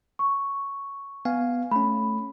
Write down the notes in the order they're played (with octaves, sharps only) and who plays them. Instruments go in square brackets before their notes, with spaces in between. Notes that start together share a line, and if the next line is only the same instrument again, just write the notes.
[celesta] C#6
[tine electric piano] B3 F5 G#5
[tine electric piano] A3 C#4 [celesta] B5